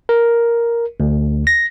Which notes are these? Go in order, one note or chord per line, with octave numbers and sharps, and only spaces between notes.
A#4
D2
A#6